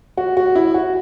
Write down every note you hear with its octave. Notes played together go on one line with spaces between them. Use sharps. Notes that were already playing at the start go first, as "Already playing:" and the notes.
F#4
F#4
E4
F#4